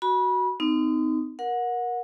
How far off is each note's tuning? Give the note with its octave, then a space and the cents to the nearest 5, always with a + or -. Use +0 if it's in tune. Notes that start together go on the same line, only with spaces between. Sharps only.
F#4 +0 B5 -30
C4 -40 D#4 +0
A#4 +20 F#5 -25